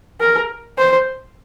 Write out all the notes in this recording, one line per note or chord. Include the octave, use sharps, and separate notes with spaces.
A#4
C5